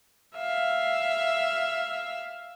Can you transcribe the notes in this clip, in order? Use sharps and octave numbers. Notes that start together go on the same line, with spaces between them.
E5 F5